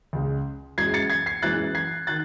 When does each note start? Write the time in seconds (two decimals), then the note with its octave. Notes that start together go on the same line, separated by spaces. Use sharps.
0.13 C#2 C#3 G#3
0.78 F#2 E3 G#3 G#6 C7
0.94 A6 C#7
1.10 G#6 C7
1.26 G#6 C7
1.42 F#2 E3 G#3 F#6 A6
1.75 G#6 C7
2.07 D#3 F#6 A6